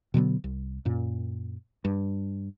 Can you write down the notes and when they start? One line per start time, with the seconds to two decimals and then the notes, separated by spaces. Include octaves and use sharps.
0.14 B2 D3 F#3 B3
0.44 C2
0.85 F#2 A#2
1.85 G2